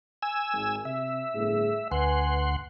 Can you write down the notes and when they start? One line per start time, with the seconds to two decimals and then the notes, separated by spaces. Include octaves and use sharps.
0.23 G#5 E6
0.53 G#1
0.85 C3 E5
1.34 G1 A2 G#4
1.91 D2 B4 F#5 G#5 C6